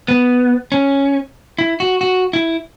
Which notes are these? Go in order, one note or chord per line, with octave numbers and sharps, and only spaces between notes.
B3
C#4
E4
F#4
F#4
E4